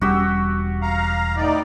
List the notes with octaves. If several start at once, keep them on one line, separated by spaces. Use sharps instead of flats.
E1 G3 C#4 F#4 G4 E6
F5 A#5
A2 D#4 D5